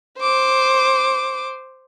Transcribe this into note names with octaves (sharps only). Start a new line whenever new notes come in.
C5 D6